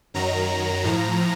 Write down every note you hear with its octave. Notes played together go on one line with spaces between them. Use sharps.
F#2 D#3 F#3 A#5
A2 F3